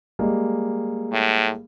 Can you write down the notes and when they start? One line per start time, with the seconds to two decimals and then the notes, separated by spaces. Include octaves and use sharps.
0.19 G3 G#3 A#3
1.13 A2